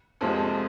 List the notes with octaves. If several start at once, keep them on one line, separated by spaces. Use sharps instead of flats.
F1 F2 C3 F3 G#3